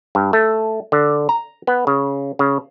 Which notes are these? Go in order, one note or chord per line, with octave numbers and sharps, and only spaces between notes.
G2
A3
D3
A#5
B3
C#3
C#3